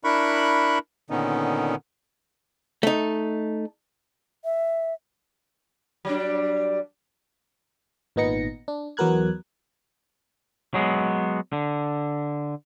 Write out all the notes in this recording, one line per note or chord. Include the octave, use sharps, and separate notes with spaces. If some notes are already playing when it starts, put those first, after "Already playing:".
D4 E4 A#4 B5 C#6 F#6
A#2 D3 D#3 B3 C#4 D#4
A3 D#4
E5
F#3 G3 D4
G#1 A#2 B3 D#4 A#6 C#7
D4
E2 F#3 B3 A#4 F#6 G#6
F#3 G#3 B3
D3